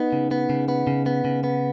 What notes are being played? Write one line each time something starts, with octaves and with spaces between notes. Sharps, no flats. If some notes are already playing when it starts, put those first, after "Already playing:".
Already playing: B3 D#4
C#3
B3
C#3
B3
C#3
B3
C#3
B3